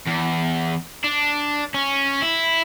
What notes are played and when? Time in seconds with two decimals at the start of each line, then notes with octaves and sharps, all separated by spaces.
0.07 E2
1.04 D4
1.74 C#4
2.22 E4